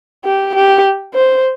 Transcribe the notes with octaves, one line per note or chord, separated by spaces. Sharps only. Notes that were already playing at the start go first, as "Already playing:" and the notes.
G4
G4
C5